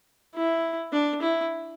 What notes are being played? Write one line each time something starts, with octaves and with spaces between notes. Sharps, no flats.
E4
D4
E4